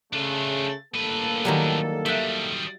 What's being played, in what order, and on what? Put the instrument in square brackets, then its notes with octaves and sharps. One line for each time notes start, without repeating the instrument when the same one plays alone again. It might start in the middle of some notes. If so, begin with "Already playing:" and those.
[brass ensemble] C#3 A3 [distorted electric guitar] D4 F4
[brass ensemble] G1 A#3 A4 [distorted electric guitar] A2 B4
[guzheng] D#3 F#3 G3
[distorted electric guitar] D#3 G3 [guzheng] E5 F#5